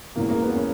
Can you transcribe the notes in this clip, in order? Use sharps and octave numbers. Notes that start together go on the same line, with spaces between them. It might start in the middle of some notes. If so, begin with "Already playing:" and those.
E1 E2 C#3 E3 A#3
A#3
B3
C#4